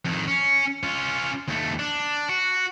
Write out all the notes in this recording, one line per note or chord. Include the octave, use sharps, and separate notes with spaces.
F2 D#3
C#4
C#4 F4
D#2 A3
D4
F#4